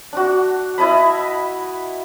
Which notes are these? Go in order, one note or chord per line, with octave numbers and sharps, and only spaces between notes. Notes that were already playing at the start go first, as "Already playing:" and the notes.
D4 F#4
E4 D#5 A5 B5